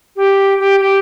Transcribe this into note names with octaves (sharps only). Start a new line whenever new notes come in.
G4
G4
G4